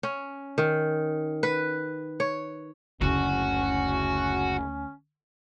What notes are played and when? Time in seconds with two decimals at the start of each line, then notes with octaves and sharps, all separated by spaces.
0.03 C#4
0.58 D#3
1.43 B4
2.20 C#5
3.01 F#1 D2 C#3 C#4 E4 F#4